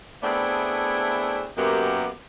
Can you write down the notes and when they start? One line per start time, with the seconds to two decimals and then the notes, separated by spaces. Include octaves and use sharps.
0.23 A3 B3 C4 D4 E4 G#4
1.58 F#2 A#3 B3 G4